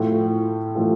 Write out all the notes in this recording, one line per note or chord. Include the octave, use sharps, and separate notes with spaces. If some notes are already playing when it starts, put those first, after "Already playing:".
Already playing: A2 F3 A3 F4 A4
A2 F3 A3 F4 A4